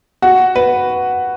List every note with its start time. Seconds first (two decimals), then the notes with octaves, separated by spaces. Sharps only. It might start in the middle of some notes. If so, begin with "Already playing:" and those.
0.22 F#4
0.56 B4